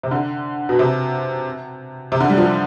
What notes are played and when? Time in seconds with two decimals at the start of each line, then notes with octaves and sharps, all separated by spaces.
0.03 C3
0.11 D3
0.69 B2
0.79 C3
2.12 C3
2.20 D3
2.30 G3
2.38 F3